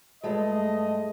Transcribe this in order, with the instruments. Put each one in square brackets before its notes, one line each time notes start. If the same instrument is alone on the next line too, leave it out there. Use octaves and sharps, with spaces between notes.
[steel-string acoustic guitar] G2 G#3 A3 [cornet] D#5